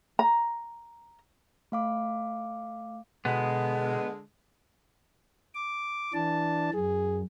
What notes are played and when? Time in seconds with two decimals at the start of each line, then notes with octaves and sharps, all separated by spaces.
0.19 A#5
1.72 A3 F5 D6
3.25 B2 D3 G#3 B3
5.55 D6
6.14 E3 D4 A5
6.74 F#2 G#4